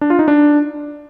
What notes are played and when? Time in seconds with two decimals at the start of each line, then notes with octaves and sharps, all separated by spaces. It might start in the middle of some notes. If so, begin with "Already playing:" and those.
0.01 D4
0.10 F4
0.19 D#4
0.28 D4